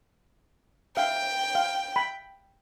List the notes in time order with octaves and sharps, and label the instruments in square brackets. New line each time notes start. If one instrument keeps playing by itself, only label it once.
[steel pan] E5 F5 [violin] G5
[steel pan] F5
B5